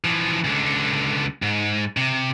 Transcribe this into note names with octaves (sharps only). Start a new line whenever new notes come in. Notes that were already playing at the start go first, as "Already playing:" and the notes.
E3 F3
C#2 D3
G#2
C3